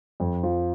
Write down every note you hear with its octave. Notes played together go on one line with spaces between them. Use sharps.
F2
F3